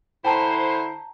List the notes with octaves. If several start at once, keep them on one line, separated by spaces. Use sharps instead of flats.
D3 E4 C5 G5 A5 A#5